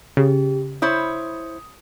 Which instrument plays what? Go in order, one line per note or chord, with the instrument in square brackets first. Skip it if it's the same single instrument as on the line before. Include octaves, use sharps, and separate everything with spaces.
[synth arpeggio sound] C#3 [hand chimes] G4
[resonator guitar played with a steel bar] E4 C5 C#5 [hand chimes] D#6